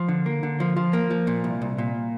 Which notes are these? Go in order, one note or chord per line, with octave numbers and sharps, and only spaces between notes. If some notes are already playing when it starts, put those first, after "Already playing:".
Already playing: F3
D3
A#3
D3
F3
F3
A#3
F3
A#2
C2
C2
A#2